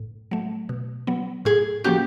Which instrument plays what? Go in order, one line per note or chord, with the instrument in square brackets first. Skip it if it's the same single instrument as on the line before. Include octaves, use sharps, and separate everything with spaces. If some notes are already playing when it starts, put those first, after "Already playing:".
Already playing: [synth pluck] A2
F#3 A3
B2
F#3 B3
[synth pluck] A2 [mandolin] G#4
[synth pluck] F3 A#3 C#4 F#4 [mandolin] G4